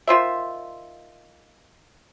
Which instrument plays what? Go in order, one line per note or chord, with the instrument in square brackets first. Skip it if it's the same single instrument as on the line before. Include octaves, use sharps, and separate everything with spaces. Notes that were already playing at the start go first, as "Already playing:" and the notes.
[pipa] D#3 F4 C5 E5